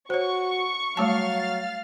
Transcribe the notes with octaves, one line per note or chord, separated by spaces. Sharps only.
F#4 C5 C#5 C#6
F#3 G3 A3 F5 A5 F6 A6